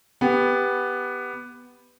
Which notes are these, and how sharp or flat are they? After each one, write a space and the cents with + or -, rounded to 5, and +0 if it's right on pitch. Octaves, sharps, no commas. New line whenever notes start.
B3 +0 G4 +10